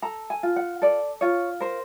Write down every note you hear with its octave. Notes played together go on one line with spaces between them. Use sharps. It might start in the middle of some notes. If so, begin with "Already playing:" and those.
A4 A#5
G#5
F4
F#5
A4 D5
F4 C#5
A#4 C5